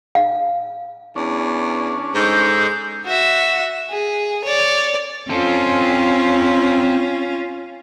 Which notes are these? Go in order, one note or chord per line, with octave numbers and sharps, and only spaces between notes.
F5
E2 C#4 D4
G#2 G#3 G#4 A4 G6
F#4 E5
G#4
C#5 D5
C4 C#4 F4 A4